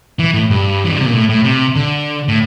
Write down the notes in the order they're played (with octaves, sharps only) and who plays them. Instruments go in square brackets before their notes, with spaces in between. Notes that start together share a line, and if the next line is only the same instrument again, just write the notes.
[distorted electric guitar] E3
A2
G2
E3
D3
C3
A#2
A2
A2
C3
D3
A2